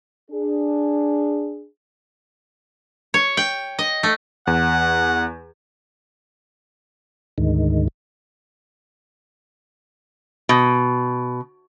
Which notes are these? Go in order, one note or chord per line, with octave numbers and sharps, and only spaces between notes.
D4 G#4
C#5
G5
D#5
A3
E2 F#5
D2 G#2 D#3
B2